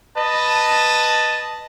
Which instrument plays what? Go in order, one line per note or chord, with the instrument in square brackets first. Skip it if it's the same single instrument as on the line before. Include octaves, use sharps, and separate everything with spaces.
[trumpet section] B4 D#5 A5